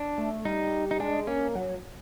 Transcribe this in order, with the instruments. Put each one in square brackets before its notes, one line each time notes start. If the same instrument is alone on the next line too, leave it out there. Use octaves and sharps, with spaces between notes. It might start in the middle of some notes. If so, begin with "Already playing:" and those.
Already playing: [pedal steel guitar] D4
[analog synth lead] A3
[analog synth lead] G3 [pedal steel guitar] D#4
[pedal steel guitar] D#4
[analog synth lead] G#3 [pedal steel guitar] D4
[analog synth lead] A#3 [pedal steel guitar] C#4
[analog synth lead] F#3